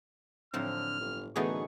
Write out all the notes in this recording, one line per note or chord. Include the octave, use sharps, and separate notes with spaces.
A2 D3 F3 F#3 C4 F6
G1
F#2 D3 E3 A3 B3 D#4 G#4 C#6